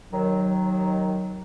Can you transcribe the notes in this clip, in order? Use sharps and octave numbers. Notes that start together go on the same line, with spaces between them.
D#2 D#3 F#3